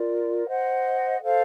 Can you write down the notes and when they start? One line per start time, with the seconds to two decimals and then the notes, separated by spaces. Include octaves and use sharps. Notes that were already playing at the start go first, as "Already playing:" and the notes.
Already playing: F4 A#4 D5
0.46 C5 D#5 F#5
1.21 A4 C5 F5